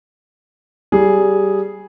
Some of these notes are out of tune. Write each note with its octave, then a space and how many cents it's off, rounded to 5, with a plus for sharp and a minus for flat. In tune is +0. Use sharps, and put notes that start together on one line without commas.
G3 -15 G#4 +0